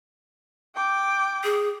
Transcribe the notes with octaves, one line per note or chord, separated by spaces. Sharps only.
G5 D6
G#4